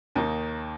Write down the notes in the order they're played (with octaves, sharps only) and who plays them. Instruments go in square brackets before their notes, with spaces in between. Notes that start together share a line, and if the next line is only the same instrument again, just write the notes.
[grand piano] D#2 D#3 A#3 D#4